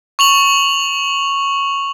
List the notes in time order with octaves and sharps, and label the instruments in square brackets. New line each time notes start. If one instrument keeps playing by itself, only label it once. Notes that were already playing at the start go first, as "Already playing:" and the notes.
[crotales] C#6 F7 F#7